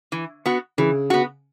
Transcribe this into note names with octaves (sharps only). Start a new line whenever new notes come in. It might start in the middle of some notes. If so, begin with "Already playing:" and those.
E3
B3 F#4
C#3 E3
B3 F#4